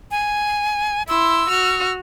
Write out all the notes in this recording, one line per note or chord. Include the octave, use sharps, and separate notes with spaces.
G#5
E4 C6 E6
F#4 F6